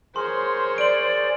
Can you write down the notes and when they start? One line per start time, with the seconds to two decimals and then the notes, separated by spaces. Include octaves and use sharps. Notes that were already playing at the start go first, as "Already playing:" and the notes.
0.16 G#4 A#4 C5 C#5 C6
0.78 D5 D7 F#7